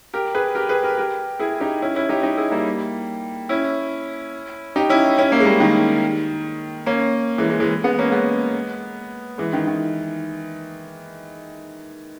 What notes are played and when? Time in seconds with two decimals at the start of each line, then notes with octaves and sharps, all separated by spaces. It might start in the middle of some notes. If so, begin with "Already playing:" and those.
0.14 G4 A#4
0.35 G#4 B4
0.55 G4 A#4
0.69 G#4 B4
0.83 G4 A#4
0.98 G4 A#4
1.39 E4 G#4
1.60 D#4 G4
1.82 C#4 E4
1.96 C#4 E4
2.09 D#4 G4
2.23 D#4 G4
2.37 E4 G#4
2.51 G3 A#3
3.49 C#4 E4
4.76 D#4 G4
4.90 C#4 E4
5.18 C#4 E4
5.32 A#3 C#4
5.40 G#3
5.46 G3 A#3
5.60 D#3
6.86 A#3 C#4
7.38 E3 G#3
7.50 E3 G#3
7.60 E3 G#3
7.84 G#3 B3
7.99 A#3 C#4
8.12 G#3 B3
9.38 E3 G#3
9.53 D#3
9.67 D#3